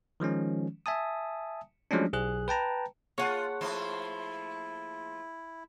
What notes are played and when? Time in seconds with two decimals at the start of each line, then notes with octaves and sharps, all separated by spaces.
0.20 D#3 F3 G#3 C#4
0.86 E5 G#5 A5 D#6
1.91 F3 F#3 G#3 A3 C#4 D4
2.13 B1 G#4 F#6
2.48 B4 G5 A5 A#5
3.18 A#3 F4 G#4 C#5 F#5 A5
3.61 F3 A3 E4 C5